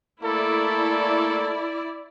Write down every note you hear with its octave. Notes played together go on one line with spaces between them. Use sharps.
A3 A#3 E4 A4 D5